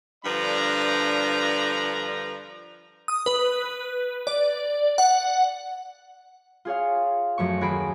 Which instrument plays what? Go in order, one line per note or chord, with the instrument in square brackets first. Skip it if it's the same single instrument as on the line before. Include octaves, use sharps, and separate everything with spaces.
[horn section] G2 D3 F3 B4 D5 A#5
[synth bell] D#6
B4
D5
F#5
[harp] F4 G#4 C#5 F5
F#2 F3 A3 C#6
D#2 F#4 G#4 B5 C7 D7